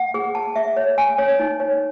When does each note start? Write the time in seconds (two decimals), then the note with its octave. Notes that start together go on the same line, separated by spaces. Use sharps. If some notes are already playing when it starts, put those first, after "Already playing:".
Already playing: F#5
0.14 G#4
0.35 A5
0.56 E5
0.76 C#5
0.98 G#5
1.18 C#5
1.39 D#4
1.60 C#5